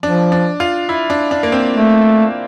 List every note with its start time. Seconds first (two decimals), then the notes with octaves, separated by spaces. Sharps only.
0.03 F3 D4
0.32 D4
0.60 F4
0.89 E4
1.10 D4
1.31 D4
1.43 A#3
1.52 C4
1.74 A3